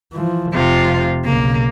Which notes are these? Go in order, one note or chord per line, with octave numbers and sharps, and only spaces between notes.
E3 F3
F1 C3 F3 F4
B1 C#3 A#3